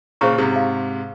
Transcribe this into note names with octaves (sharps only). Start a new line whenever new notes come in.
A#2 C#3 G#4 C5 F5 A#5 C#6
G#2 C3
F5